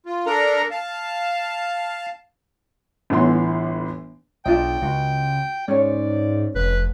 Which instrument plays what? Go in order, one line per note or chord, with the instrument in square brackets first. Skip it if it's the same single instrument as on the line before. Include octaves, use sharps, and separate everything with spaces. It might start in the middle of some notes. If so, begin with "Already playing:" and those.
[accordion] F4
D4 A4 A#4 A#5
F5 A5
[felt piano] G1 A2 E3 B3 C#5 C6
[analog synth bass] B1 [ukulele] D4 F4 D#5 [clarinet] G5
[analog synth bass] C#2 [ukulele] F#4
[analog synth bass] G#2 [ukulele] C#4 C#5 [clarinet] D5
[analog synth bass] F1 [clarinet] B4